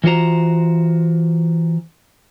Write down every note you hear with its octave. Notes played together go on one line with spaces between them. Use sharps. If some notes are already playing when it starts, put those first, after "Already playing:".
E3 F4 F#4 C5 A#5